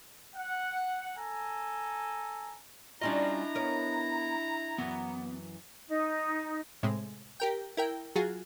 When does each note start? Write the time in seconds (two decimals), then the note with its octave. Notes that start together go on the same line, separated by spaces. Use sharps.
0.34 F#5
1.17 A4 G#5 A#5
3.01 G3 C#4 D4 E4 F4 D#5 A#5
3.55 B3 A#4 C#5
4.78 F#2 E3 F#3 B3
5.88 D#4
6.83 A2 C3 G#3
7.40 G4 A#4 G5
7.77 E4 A#4 G5
8.15 F#3 F4 F#4 G#4